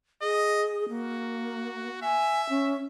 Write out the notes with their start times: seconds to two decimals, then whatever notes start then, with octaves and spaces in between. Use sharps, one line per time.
0.22 G#4 D#5
0.89 A#3 F#4
2.02 E5 G#5
2.49 C#4